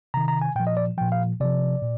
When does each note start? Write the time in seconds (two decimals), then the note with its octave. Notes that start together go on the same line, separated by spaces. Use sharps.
0.14 C3 D#3 A#5
0.28 A#5
0.41 G#5
0.56 A#2 G5
0.60 F3
0.67 D#5
0.77 D5
0.98 A#2 F3 G5
1.12 F5
1.41 C3 F3 D5
1.82 A#2